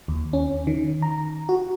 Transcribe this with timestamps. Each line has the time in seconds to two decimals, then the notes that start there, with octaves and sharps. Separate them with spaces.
0.08 D#2
0.33 C#4
0.67 D#3
1.02 A#5
1.49 F#4